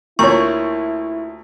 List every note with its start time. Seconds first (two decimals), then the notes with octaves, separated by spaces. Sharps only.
0.19 D2 A#2 E4 A#4 C#5 C#6